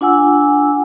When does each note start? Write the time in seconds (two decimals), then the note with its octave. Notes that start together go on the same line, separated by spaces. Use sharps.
0.01 D4 F4 F#5 G#5 E6